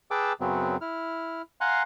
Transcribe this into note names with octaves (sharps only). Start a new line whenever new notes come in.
G#4 B4 G5 A5 D6 E6
F#2 C#3 F#3 B3 C4
E4 F6
F5 F#5 G#5 A#5 C6 F#6